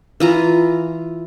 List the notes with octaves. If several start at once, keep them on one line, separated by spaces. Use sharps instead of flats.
E3 F4 A#5